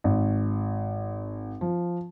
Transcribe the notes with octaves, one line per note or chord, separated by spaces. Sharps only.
G#1
F3